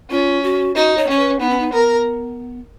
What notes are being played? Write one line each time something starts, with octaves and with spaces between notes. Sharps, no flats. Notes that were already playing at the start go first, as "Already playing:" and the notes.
C#4 F4
F#4
D#4 F#4
C#5
C#4 C#5
B4
B3 D#4
C#4
D#4
B3 A#4